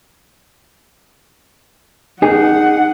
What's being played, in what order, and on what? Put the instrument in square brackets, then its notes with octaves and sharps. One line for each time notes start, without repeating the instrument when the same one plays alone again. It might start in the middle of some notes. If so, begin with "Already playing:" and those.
[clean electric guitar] D#4 G#4 [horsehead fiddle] F#5